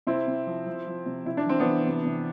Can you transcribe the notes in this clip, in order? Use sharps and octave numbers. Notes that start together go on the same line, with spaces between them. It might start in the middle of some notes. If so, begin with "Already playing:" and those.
C3 C4 E4
C3
F3
F3
F3
C3
C3 E4
D4
E3 C4
B3 D4
E3
C3
C3